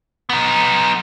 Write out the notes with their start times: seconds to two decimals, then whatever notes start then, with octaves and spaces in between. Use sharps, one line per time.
0.29 B3 D#4